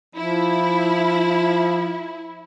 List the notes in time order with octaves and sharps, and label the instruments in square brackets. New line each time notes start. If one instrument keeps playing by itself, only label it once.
[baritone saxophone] F3 [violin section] E4